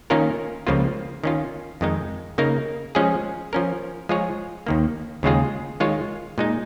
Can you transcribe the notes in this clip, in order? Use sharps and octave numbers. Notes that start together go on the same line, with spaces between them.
D#3 A#3 C#4 F4 A#4
C#2 C#3 F3 A#3 F4
D#3 C#4 F4
F2 D#3 G#3 D#4
C#3 A#3 D#4 A#4
F3 G#3 C#4 G#4
F3 C#4 A#4
F3 G#3 F4 G#4 C#5
D#2 D#3 A#3
D#2 C#3 G#3 F4 G#4
D#3 G#3 F4 C#5
A#2 G#3 D#4